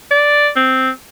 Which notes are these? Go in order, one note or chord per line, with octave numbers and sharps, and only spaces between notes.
D5
C4